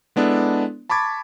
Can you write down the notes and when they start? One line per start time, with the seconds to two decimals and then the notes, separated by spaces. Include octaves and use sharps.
0.16 G#3 B3 D4 E4 A4
0.89 A5 B5 C#6 D6 G#6 A6